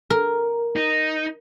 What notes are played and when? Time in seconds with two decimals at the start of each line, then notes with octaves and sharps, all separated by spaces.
0.10 A#4
0.76 D#4